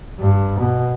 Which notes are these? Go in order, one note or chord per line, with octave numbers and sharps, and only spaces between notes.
G2
B2